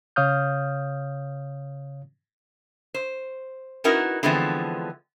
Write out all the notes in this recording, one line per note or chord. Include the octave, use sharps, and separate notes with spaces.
C#3 C#5 F5 D#6 F6 G6
C5
C#4 D#4 E4 F#4 A#4 B4
D3 E3 F3 G#3 B3 C4